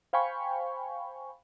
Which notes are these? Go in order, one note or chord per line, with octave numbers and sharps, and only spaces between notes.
C5 F5 G5 G#5 B5 C#6